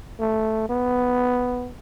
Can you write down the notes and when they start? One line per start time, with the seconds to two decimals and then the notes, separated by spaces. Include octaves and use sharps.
0.20 A3
0.69 B3